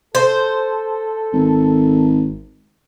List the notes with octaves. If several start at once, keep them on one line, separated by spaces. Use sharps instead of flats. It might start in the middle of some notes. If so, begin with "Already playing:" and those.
A4 C5
G#1